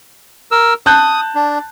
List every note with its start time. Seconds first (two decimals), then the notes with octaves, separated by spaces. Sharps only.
0.51 A#4 E6
0.86 A5 D#6 F#6 G6
1.35 D4